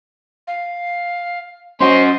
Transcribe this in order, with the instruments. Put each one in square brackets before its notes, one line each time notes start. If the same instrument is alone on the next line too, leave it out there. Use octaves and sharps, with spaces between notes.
[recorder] F5
[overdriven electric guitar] C#4 F#4 [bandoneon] C5 C6 [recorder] D#5